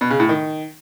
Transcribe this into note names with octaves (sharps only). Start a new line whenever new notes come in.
B2
C#3
A2
D#3